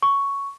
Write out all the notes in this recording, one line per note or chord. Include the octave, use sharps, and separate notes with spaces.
C#6